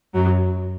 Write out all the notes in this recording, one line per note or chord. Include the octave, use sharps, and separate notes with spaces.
F#2 F#3